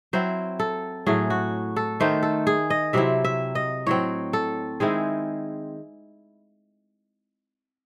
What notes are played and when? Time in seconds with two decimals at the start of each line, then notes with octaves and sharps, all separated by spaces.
0.13 F#3 C4 E4 C5
0.59 A4
1.06 A2 F#3 A3 G#4
1.30 F#4
1.76 A4
2.00 D#3 A3 D#4 C5
2.23 A4
2.47 G#4
2.70 D#5
2.93 C3 F#3 C4 E4 E5
3.25 E5
3.55 D#5
3.87 A2 F#3 C4 C#5
4.33 A4
4.80 D#3 G#3 C4 E4 G#4